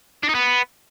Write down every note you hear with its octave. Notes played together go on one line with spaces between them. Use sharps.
D4
D#4
B3